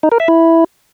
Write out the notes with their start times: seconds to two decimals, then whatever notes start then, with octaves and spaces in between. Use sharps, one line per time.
0.03 D#4
0.12 A#4
0.20 E5
0.28 E4